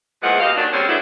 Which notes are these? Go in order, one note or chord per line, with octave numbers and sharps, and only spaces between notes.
E2 A#2 E3 F3 G#3 F#5
B2 A#3 G4 D#5 F5
D#2 D#3 F#3 D4
G3 G#3 A#3 C4 C#4
F#3 G#3 A3 B3 D4 E4